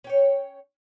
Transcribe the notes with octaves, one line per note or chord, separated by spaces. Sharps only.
C#4 C#5 G5